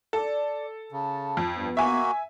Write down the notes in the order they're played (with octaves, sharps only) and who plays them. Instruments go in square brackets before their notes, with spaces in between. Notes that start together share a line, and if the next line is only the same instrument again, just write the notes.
[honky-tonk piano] A4 [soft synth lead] D5
[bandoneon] C#3 [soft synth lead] A5
[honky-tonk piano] F2
[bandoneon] G2 [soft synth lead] B3
[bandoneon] A#3 F#4 [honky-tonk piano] E5 G#5